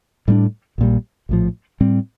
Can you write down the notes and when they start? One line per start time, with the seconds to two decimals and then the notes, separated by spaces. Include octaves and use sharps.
0.28 A2 G3 A#3 D4
0.78 A#1 A#2 G3
1.29 A#1 A2 F3
1.80 A2 G3 C4